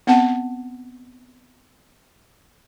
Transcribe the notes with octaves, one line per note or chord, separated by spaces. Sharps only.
B3 C4 F#5 A5